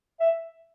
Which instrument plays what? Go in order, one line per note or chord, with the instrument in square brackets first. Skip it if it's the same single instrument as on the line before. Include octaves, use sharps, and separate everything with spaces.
[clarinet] E5